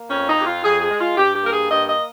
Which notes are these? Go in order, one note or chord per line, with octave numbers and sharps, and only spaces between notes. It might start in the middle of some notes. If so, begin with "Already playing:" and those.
Already playing: A#3
F2 C#4
D#4
F2 G4
F4
F2 G#4
G#4
G#3
F4
G2 G4
G4
A#3 A#4
G#4
G2 D#5
D#5